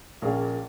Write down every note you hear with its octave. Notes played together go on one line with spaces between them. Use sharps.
A#1 A#2 A#3 C#4 G#4